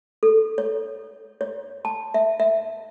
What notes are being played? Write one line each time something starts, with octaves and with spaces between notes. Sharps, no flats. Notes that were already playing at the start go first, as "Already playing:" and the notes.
A4
C#5
C#5
A5
E5
E5